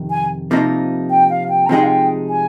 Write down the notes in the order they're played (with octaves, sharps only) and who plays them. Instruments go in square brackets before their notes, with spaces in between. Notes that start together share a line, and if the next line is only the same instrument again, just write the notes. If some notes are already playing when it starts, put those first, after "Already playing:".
Already playing: [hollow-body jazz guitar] F2 C3 D#3
[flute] G#5
[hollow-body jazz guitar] C3 F3 A#3 D#4
[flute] G5
F5
G5
A#5
[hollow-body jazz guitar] C3 F3 G#3 D#4 G#4 [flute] G5
[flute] F5
G5
G#5